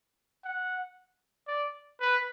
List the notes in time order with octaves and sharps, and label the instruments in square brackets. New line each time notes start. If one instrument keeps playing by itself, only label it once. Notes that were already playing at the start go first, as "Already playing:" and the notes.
[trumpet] F#5
D5
B4